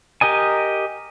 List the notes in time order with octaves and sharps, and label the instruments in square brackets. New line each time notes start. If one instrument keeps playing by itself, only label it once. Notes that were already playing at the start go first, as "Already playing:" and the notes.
[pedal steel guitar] G4 A#4 D#5 G#5